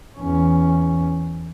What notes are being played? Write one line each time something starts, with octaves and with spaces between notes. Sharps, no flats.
E2 C#4